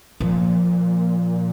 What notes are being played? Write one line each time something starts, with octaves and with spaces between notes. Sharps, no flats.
A#2 F3